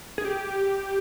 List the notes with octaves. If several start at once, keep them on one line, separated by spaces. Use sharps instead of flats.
G#4
G4